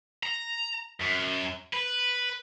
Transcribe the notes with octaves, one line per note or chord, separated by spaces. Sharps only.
A#5
F#2
B4